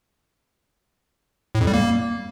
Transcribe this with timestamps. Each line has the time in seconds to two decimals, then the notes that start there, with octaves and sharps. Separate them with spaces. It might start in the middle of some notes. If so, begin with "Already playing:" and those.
1.55 A2
1.61 F2
1.67 G3
1.74 A#3